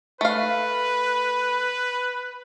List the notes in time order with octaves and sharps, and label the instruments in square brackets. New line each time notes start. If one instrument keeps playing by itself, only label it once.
[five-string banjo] A3 F5 [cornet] B4